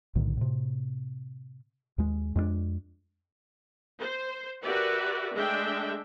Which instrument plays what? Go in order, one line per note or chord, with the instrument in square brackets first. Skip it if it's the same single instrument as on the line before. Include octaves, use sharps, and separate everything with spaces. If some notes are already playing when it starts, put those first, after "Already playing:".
[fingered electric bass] B1 A2 D3 D#3
A2 C3
D#2 G#3
F2 G#3 A#3 D4
[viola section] C5
F#4 G4 A#4 B4 D5 E5
G#3 A3 D4 E5 G5